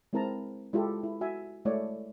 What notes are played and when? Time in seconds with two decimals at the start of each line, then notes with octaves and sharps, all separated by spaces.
0.13 G#3 C4 E4 A#4 A5 A#5
0.73 G#3 E4 F4 G4 A4
1.04 E4
1.21 F#4 E5 G#5
1.65 G#3 A3 E4 C#5 D5